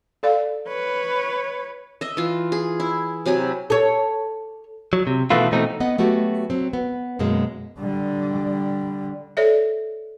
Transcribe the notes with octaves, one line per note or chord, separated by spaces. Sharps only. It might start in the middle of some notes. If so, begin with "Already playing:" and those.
A4 D5 F5
B4 C#5
D#5 E5
E3 F4
G#4
E4
C3 F#3 G#5 B5
A4 C#5
F#3
C3
B2 D#3 E3 A3 E4 F4
B2 E3 A3 C4 D#4
B3 D#5 F#5
F#3 A3 B3 F#4 G4
F#3 C4
B3
F#2 B2 G#3 A#3
D3 G3
A4 C#5 D5 E5